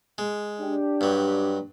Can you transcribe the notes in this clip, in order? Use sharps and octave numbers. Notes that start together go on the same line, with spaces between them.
G#3
D4 G4
G2 F#3